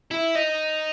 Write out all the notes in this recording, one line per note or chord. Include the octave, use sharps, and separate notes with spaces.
E4
D#4